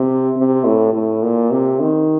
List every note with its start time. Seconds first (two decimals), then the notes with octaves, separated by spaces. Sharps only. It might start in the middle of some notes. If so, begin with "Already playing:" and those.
Already playing: C3
0.36 C3
0.65 A2
0.94 A2
1.23 A#2
1.51 C3
1.80 D#3